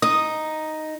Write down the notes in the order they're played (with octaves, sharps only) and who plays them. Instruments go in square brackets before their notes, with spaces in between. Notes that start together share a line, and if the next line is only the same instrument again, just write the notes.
[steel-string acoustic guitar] D#4 [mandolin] D#6